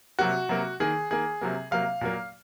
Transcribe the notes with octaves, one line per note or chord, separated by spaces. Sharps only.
C3 F#3 A#3 F#4
C3 F#3 A#3
D#3 A#3 G#4
D#3 A#3 G#4
C3 F#3 A#3
C3 F#3 A#3 F5
A#2 F#3 A#3